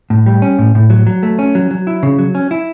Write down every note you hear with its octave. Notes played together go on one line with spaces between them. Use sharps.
A2
G3
C#4
A2
A2
F#3
F#3
A3
C#4
F#3
F#3
E4
C#3
F#3
C#4
E4